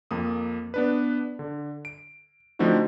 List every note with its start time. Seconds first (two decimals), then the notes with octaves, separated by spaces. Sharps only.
0.11 F2 A#3 D#6
0.74 B3 D4 B4
1.39 D3
1.85 D7
2.59 D3 F3 A3 C4 D#4 F#4